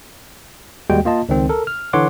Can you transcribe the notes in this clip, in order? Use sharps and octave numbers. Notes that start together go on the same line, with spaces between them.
D#2 G3 G#3 F#4 G5
A#3 F4 D#5 A5
C#2 D#3 C4
A4 A#4
F6
D3 E3 C#5 F#5 C6 D6